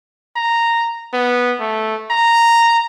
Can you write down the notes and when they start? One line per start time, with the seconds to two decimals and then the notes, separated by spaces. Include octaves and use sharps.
0.36 A#5
1.14 B3
1.60 A3
2.11 A#5